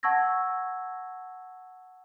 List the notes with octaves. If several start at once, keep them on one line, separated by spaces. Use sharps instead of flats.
F#5 A5 C#6 E6 G#6 A#6